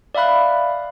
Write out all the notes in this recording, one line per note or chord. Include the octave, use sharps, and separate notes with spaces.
D5 E5 F5 B5 F#6